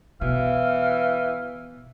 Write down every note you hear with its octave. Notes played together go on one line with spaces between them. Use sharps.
B2 E3 F5